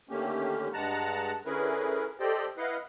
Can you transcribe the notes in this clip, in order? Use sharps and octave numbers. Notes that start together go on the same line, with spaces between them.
D3 D#3 A3 A#3 C#4 G4
G2 G#3 F#5 A5 A#5
D3 C#4 E4 G#4 A#4 B4
G4 A4 C5 D5 D#5 G5
E4 B4 D#5 F5 F#5